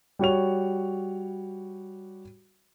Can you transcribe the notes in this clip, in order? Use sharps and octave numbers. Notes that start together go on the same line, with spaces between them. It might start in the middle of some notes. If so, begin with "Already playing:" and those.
G3 F#4 C#5 F7